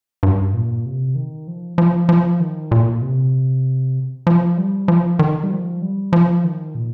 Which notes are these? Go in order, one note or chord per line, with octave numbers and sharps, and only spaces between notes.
G2
A#2
C3
D#3
F3
F3
F3
D#3
A#2
C3
F3
G3
F3
D#3
G3
F3
G3
F3
D#3
A#2